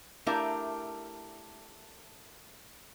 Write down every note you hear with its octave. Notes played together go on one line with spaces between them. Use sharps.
A3 D4 E4 G4 A#4 F5